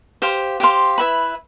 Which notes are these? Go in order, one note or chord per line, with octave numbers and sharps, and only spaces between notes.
G4 C5 F5 C6
G4 C5 F5 C6
E4 B4 E5 B5